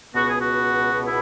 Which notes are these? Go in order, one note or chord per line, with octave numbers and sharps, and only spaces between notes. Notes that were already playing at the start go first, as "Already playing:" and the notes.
C#2 B2 B3 F#4
G#4
F#4
E4